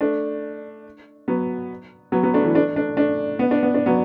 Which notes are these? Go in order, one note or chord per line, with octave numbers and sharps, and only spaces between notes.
A3 D4
F#3 B3
F#3 B3
F#3 B3
A3 D4
E3 A3
A3 D4
A3 D4
A3 D4
B3
D4
B3
D4
F#3 B3